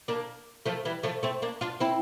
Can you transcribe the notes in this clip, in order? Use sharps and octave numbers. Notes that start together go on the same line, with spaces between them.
A#3 D4
F3 A3
E3 G3
F3 A3
A3 C4
A#3 D4
D4 F4
C4 E4